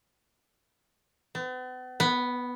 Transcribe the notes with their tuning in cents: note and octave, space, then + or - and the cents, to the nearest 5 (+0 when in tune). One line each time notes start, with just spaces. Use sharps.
B3 +45
B3 +0